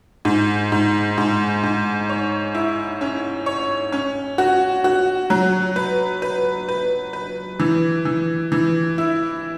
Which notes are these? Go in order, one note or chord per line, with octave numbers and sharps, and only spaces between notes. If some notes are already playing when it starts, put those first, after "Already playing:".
G#2
G#2
G#2
G#2
C#5
E4
C#4
C#5
C#4
F#4
F#4
F#3
B4
B4
B4
B4
E3
E3
E3
E4